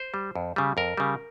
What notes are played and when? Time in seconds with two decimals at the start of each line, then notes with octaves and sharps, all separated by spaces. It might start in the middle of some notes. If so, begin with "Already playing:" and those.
Already playing: C5
0.14 G3
0.35 F2
0.56 C#3 G3
0.77 F2 A#4
0.97 C#3 G3